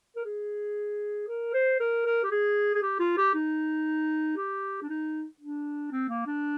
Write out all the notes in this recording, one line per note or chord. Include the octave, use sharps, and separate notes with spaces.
A#4
G#4
A#4
C5
A#4
A#4
G4
G#4
G#4
G4
F4
G4
D#4
G4
D4
D#4
D4
C4
A#3
D4